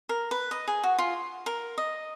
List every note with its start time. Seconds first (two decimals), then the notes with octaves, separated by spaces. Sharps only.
0.09 A#4
0.31 B4
0.51 D#5
0.68 G#4
0.83 F#4
0.98 F4
1.46 A#4
1.78 D#5